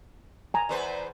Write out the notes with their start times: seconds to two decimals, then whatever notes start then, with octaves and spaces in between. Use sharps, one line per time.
0.54 G#5 A#5
0.69 E2 B4 C5